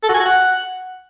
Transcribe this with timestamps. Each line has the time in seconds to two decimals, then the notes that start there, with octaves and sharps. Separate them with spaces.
0.03 A4
0.09 F#4
0.14 G#5
0.20 F#4
0.25 F#5